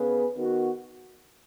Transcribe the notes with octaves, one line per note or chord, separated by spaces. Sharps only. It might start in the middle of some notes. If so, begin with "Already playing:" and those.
Already playing: C#3 B3 G#4 B4
D#3 B3 F#4